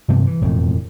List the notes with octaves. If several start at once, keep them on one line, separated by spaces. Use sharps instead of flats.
G2 C3 F3 B3
E3
E1 F2 A2